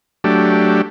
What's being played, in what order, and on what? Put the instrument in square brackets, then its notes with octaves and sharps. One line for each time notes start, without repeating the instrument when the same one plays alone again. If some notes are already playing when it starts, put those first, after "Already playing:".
[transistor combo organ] F#3 A3 D4 G4